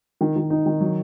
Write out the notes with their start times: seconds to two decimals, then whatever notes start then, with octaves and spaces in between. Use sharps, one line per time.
0.21 D#3
0.36 D#3
0.50 D#4
0.66 D#3
0.81 F#3